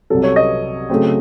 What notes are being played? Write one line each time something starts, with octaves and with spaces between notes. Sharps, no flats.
C2 C3 F#3 A4
C#5
D#5
C#3 F#3 A3 C4